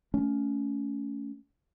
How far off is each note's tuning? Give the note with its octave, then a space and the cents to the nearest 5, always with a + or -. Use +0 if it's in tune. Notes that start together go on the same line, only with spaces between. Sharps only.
A3 +0 C#4 +20